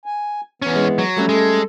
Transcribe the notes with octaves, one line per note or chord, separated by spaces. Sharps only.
G#5
E2 E3 B3 C#4
G#3
F#3
G3 A3 C#4
G#3 A4